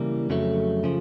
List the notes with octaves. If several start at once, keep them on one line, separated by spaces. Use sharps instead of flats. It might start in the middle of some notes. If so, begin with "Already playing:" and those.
Already playing: C#3 E3 G3 A#3
F2 C#3 F#3 A3
C#3 F3